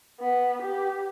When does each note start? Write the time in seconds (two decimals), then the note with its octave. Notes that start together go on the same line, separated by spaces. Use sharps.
0.20 B3
0.62 G4